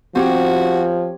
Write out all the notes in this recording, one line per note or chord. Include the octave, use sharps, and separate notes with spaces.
F3 C4 F#4 G4 C#5